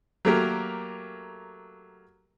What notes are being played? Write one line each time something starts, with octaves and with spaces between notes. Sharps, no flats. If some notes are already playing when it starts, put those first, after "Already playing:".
F#3 A3 A#3 G4 A#4